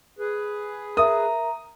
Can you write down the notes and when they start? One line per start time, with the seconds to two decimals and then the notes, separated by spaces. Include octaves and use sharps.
0.19 G#4 B4
0.97 A#4 E5 A#5 D#6